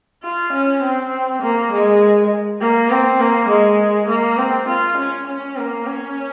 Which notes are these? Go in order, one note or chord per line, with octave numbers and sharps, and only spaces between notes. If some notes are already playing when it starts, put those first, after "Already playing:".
F4
C#4
C4
A#3
G#3
A#3
C4
A#3
G#3
A#3
C4
F4
C#4
C#4
A#3
C#4